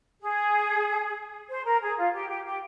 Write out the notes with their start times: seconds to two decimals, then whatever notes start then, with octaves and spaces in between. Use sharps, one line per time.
0.21 G#4
1.49 C5
1.64 A#4
1.81 G#4
1.97 F4
2.13 G4
2.28 G4
2.44 G4